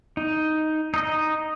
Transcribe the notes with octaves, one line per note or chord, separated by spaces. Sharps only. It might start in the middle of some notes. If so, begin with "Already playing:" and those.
D#4
D#4 D#5